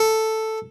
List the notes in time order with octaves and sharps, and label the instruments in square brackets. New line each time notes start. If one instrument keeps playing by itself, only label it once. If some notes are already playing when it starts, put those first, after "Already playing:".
Already playing: [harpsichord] A4